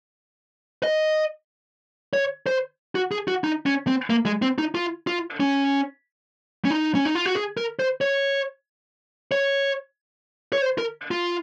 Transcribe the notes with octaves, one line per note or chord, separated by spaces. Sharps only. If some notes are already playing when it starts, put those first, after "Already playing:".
D#5
C#5
C5
F#4
G#4
F#4
D#4
C#4
C4
A#3
G#3
C4
D#4
F4
F4
C#4
C#4
D#4
C#4
D#4
F4
F#4
G#4
A#4
C5
C#5
C#5
C#5
C5
A#4
F4